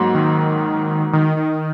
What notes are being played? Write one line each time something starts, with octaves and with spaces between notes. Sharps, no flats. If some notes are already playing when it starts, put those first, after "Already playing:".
Already playing: G#2 F#3 A#3
D#3
D#3
D#3